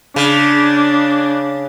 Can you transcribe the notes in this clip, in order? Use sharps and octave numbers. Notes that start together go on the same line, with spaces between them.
C#3 D4